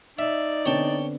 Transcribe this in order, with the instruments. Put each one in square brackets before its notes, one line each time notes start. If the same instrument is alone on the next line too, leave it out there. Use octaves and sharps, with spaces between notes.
[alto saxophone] D#4 [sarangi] D5 [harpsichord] E5
[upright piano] D3 B3 C4 [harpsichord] C#5 G5 A5